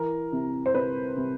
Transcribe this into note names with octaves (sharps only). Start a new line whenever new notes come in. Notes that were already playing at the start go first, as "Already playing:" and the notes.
Already playing: E3 A#4
C3
C5
C3 B4
C3